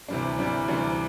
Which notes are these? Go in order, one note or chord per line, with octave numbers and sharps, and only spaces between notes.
D2 C3 E3 G3 D4
D2 C3 E3 G3 D4
D2 C3 E3 G3 D4